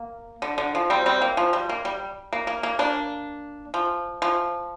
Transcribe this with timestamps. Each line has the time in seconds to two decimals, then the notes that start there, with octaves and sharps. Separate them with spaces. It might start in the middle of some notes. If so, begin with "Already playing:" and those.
Already playing: A#3
0.42 D3
0.58 D3
0.75 F3
0.90 G3 C4
1.06 G3 C4
1.22 A#3
1.37 F3
1.53 G3
1.69 A#3
1.85 G3
2.33 A#3
2.47 A#3
2.63 A#3
2.79 A#3 D4
3.74 F3
4.22 F3